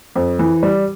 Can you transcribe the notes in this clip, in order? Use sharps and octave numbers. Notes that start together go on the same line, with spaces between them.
F2
E3
G3